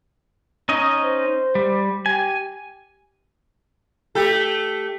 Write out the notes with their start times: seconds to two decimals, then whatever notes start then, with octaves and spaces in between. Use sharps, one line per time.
0.69 C#4 D#4 D#5
1.04 C5
1.55 G3
2.06 G4 G#5
4.15 A3 G4 A4